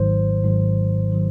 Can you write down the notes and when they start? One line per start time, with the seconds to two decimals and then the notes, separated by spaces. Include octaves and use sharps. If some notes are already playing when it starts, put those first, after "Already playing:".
Already playing: G#1 G#2 D#3 F#3 C5
0.42 G#1 G#2 D#3 F#3
1.13 D#3 F#3